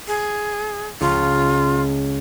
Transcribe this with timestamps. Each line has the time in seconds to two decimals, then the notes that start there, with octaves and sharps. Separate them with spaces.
0.07 G#4
1.01 C#2 F4